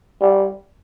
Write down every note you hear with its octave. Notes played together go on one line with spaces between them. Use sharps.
G3